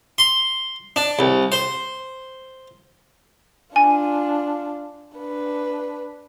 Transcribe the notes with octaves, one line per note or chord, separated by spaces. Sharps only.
C6
D4
C2
C5
D4 F4 G#5
D4 B4